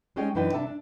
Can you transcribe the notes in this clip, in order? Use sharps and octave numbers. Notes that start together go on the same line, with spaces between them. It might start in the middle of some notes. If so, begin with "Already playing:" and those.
G3 G#3 C#4 D#4 G#4 G5
F#2 E3 D4 D#4 B4 G5
C3 D4 E5 A5
D4